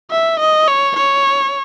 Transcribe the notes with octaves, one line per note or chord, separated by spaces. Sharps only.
E5
D#5
C#5
C#5